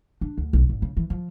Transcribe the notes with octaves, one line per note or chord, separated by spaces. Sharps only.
D4
D2
B1
G#1
C#3
E3
F3